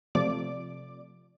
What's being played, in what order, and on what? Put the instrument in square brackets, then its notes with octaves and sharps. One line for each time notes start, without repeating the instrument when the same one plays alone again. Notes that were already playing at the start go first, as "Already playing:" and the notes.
[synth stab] C3 F3 A3 D5 D6